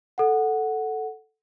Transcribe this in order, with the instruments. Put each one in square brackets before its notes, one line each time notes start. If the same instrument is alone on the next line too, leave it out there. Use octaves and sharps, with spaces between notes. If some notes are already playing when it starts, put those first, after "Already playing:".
[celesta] A4 F#5